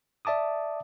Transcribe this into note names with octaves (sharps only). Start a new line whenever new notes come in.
D5 E5 A5 D6 D#6